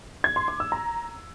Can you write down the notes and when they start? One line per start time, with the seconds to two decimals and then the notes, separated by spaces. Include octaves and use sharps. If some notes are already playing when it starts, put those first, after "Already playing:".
0.24 G#6
0.36 C6
0.48 D6
0.60 E6
0.72 A#5